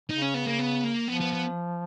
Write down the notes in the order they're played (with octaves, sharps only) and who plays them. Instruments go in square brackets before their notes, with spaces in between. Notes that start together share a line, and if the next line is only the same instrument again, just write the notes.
[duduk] C#3 [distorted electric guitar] D#4
[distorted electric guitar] C#4
B3
A#3
B3
A#3
[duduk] F3 [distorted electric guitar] B3
[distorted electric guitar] B3
B3